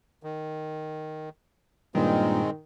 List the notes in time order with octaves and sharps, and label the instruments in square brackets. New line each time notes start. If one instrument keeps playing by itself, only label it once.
[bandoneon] D#3
[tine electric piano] G2 A#2 [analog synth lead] D#3 [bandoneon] G#3 C4